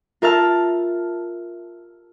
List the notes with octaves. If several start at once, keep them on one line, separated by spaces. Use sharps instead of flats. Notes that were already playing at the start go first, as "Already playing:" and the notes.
F4 A#4 E5 A5 F6